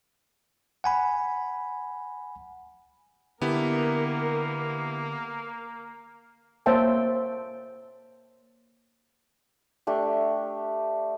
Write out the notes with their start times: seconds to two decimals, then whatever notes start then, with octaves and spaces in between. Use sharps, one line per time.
0.84 F#5 G#5 B5
3.41 D3 A#3 B3 E4 G4 A#4
6.66 A#3 C5 C#5 E5 G5 A5
9.87 A3 D4 G4